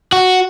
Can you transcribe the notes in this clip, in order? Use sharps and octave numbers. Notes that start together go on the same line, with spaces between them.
F#4